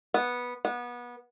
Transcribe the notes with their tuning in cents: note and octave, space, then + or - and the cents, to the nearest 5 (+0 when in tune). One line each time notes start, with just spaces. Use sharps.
B3 -10
B3 -25